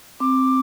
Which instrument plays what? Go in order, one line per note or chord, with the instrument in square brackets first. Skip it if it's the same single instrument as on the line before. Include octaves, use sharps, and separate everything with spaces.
[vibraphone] C4 [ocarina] D6